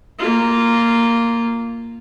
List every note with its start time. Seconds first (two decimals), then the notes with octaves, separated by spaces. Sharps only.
0.19 A#3 F4